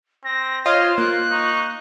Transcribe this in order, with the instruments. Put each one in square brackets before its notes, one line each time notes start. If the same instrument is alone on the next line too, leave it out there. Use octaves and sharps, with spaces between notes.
[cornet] C4 [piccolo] A#6
[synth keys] F4 D#5 [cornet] C5 [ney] C#5 [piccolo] F6
[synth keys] A#3 [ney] F4 [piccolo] F#6
[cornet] D#4 [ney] C#6